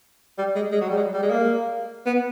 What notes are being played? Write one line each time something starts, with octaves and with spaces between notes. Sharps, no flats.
G3
G#3
G#3
F#3
G3
G#3
G3
G#3
A#3
B3